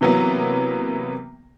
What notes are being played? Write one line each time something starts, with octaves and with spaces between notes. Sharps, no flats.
C3 E3 F#3 A#3 B3